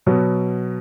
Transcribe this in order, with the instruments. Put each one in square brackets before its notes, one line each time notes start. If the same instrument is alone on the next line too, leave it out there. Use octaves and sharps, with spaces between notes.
[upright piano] B2 F#3 B3